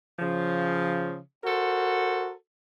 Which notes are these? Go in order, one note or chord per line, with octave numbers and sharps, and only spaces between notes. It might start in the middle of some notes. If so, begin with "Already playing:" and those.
C#3 F3
F#4 A4 A#4 C5